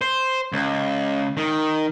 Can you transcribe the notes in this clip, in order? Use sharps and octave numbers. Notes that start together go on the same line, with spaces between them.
C5
C#2
D#3